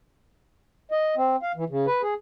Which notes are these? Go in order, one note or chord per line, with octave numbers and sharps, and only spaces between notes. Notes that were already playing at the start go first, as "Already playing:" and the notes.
D#5
C4
F5
E3
C#3
B4
G#4